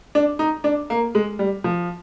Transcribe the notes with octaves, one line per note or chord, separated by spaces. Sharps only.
D4
D#4
D4
A#3
G#3
G3
F3